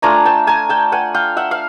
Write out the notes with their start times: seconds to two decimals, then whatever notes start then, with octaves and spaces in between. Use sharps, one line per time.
0.02 A3 D4 F4 G#5 A#5
0.25 G5 A5
0.47 G#5 A#5
0.69 G5 A5
0.92 F#5 G#5
1.14 F5 G5
1.37 E5 F#5
1.51 F5